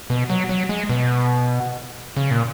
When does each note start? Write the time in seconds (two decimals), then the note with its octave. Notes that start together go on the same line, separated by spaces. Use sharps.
0.10 B2
0.30 F#3
0.49 F#3
0.69 G#3
0.89 B2
2.17 C#3
2.31 A#2